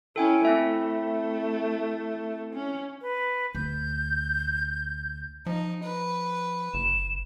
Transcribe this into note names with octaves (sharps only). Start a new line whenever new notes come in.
C#4 E4 A4 G5 G#5
A3 C4 E4 E5
C#4
B4
D2 G6
F3 D#4
B4
F#1 E7